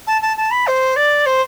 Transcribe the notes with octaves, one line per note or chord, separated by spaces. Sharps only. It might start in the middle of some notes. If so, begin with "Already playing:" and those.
A5
A5
A5
B5
C5
D5
C5